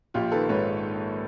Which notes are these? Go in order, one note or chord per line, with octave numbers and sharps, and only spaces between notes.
A#1 F4 G4
D#3 A4 B4
G#2 B4 C#5